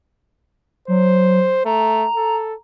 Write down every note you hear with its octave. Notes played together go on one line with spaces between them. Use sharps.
F#3 C5
A3 A#5
A4